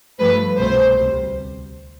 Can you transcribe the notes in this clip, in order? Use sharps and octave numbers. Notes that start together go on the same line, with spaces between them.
G2 F3 A3 B4
C2 B2 A3 C5
D2 C3 G3